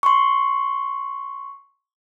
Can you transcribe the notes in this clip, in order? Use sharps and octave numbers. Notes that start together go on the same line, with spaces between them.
C6 C#6